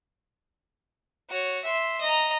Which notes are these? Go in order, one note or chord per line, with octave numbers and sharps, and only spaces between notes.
F#4 C#5
E5 C6
D#5 A#5